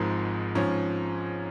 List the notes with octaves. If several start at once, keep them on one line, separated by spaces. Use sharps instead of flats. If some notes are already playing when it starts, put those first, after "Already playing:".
Already playing: G#1 G#2 F3 G#3 A#4
G#2 F3 C#4